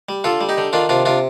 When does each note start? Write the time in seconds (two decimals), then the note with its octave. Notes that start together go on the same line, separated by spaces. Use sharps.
0.09 G3
0.24 D3 F4 A4
0.41 G3
0.49 D#4 G4
0.58 D3
0.73 D#3 D4 F4
0.89 C3 D4 F4
1.05 C3 D4 F4